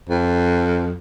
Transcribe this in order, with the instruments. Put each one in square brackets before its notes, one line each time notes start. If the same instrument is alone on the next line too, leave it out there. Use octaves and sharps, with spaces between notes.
[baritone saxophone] F2